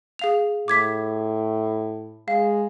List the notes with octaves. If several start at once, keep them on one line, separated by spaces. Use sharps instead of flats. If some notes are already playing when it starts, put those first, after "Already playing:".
G#4 F5 F7
A2 D6 G#6 B6
G#3 F5